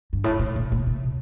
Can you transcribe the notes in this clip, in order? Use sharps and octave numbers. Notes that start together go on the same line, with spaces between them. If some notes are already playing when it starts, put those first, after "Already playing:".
G2
A2
A2
A#2
A#2
C3